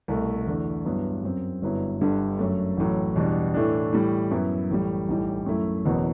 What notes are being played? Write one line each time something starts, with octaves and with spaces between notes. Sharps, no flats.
C2 B2 A3
E2 D3 A3 D4
G2 F#3 B3 E4
F#2 F#3 C4
G1 G2 F#3 B3 E4
G1 G2 D3 G3
F#2 F#3 A3
A1 A2 F#3
E2 B2 G3 D4
A2 E3 A3 D4
A2 E3 G3
F#2 F#3 B3 E4
A1 A2 G3
B1 A2 E3 G3
F#2 F#3 A3 E4
F#1 E2 B2 F#3 B3